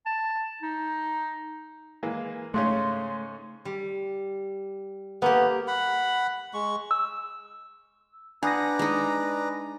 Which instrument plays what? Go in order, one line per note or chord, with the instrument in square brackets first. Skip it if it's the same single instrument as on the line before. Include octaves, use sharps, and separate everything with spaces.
[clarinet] A5
D#4
[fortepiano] E3 G#3 A#3
[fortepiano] G#2 C#3 C#4 [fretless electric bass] A3 [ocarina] C6
[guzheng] G3
[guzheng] A#3 G4 [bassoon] B3
[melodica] F#5 B5
G#3 C#6
[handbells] E6
[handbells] D4 [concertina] B4 D5 A#5 [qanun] F#5 [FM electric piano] G#5 D#6 A#6
[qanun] G#3 D#4